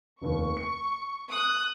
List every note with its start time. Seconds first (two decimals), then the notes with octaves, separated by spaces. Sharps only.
0.21 F1 D#2 C#6
0.57 C#7
1.31 D#6 F#6